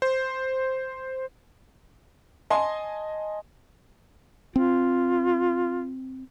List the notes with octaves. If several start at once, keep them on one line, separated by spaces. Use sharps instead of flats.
C5
D#5 G#5 A5 C6
C4 F4